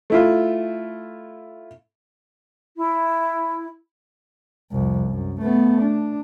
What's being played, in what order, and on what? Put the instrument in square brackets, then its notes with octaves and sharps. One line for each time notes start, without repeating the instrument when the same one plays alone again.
[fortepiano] A3 E4 F4
[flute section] E4
[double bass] C2 F2
F#2
A3 B3
D4